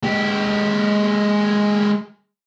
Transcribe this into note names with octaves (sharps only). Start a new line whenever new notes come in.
G#3 G4